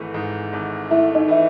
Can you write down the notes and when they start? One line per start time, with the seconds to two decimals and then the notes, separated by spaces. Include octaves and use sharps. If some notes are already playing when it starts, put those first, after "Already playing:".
Already playing: G#1 G#2 E3 A3
0.14 G#2
0.53 G#1
0.91 A3 E4 E5
1.15 D#4 D#5
1.28 E3 E5